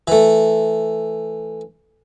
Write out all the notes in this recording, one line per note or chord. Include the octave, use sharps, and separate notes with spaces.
E3 A3